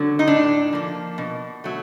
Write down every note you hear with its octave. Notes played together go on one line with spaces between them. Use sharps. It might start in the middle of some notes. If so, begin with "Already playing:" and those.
Already playing: D3 F#3
D#4
A2 D4
F3 A#3
B2
F#3 A3